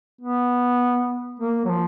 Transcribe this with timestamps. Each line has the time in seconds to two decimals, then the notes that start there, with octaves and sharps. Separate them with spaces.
0.21 B3
1.40 A#3
1.65 F#3
1.69 F3